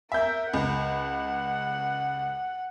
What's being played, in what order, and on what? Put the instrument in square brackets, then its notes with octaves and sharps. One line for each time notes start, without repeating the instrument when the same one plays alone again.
[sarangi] A#4 [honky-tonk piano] E5 G6
[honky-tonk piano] C#2 [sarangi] F#5